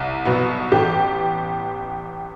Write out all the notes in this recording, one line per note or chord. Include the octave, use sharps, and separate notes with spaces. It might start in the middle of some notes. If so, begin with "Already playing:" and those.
Already playing: C2
B2 F#3 B3
A1 G4